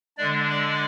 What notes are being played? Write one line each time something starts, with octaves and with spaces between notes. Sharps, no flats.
D3 G#3 D4 D5
D5